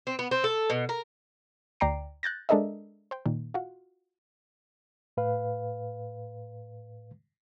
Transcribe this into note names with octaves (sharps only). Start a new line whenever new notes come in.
C4
B3
C4
A4
B2
A#4
D2 D5 G5 A#5 C7 D7
F#6 G6 A6 A#6
G#3 D4 A4 A#4 D#5 E5
C5 G5
A#2 D#3
F4 F#4
A2 B4 F5